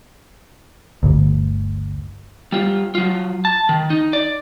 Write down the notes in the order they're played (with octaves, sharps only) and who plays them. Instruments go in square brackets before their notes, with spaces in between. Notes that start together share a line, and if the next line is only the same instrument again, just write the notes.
[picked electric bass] G1 D2
[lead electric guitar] G3 F4
F#3 F4
A5
D#3
D#4
D5